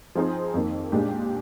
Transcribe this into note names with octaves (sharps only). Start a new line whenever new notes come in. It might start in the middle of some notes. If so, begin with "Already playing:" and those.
F3 C4 D#4 G#4 C5
F2 D#3 A#3
A#2 G#3 D4 G4